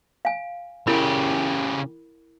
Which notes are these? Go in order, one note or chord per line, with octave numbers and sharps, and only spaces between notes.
F5 G#5
C#3 E4 G4 A#4 B5